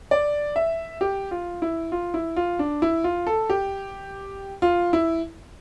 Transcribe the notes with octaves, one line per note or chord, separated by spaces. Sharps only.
D5
E5
G4
F4
E4
F4
E4
F4
D4
E4
F4
A4
G4
F4
E4